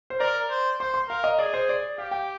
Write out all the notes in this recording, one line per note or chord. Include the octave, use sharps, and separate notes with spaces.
C5
A#4 D5
C5
C5 C6
C6
A#4 F5
D#5
G#4 D5
C5
D5
G4 F5
G5